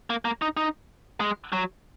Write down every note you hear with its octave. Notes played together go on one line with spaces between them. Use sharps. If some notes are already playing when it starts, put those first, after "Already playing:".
A#3
A#3
D#4
D#4
G#3
F#3